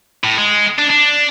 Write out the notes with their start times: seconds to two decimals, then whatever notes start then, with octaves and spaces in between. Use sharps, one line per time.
0.24 A2
0.38 G#3
0.78 D4
0.90 D4